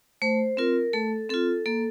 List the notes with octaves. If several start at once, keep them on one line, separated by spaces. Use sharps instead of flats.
A3 C5
C4 F4 A#4
A3 A4
C4 F4 A4
A#3 A4